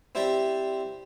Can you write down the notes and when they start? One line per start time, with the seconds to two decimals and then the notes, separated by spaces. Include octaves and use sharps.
0.15 C4 E4 G4 D5 G5